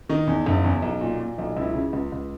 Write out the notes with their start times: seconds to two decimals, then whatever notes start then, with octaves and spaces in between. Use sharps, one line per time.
0.09 D#3 D#4
0.27 E2
0.46 F#1
0.64 E2
0.82 B1
1.01 A#2
1.20 A#2
1.38 B1
1.57 C#2 E4
1.75 C#3
1.93 C#2
2.12 C#2